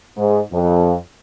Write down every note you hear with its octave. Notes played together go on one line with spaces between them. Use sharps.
G#2
F2